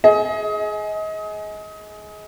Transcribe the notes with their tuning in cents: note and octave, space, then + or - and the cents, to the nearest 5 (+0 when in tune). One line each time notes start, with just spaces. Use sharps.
G#4 +20 D#5 +25